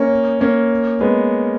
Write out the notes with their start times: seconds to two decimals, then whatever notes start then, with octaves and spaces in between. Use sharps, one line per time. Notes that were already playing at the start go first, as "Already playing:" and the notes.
Already playing: A#3 C#4
0.41 A#3 C#4
1.00 G#3 B3